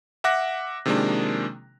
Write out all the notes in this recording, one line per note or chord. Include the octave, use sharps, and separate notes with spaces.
E5 F#5 D6 F#6 A#6
C3 D#3 F3 G#3 A#3 D4